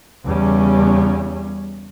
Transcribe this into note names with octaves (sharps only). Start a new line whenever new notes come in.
E2 C#3 G3 C#4